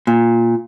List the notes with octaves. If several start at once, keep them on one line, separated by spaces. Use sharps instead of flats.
A#2